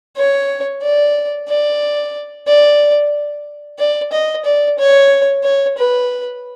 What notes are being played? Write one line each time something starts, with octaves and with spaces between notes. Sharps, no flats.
C#5
D5
D5
D5
D5
D#5
D5
C#5
C#5
B4